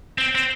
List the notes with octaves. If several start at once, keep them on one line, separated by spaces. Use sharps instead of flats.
C4
C4